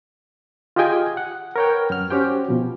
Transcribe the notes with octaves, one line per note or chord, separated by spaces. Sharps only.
F4 G4 G#4 D#5 G5 G#5
F#5
A#4 B4 C#5 F#5 G5
F#2 F6
C#4 F#4 G4 C5 G5
B2 F3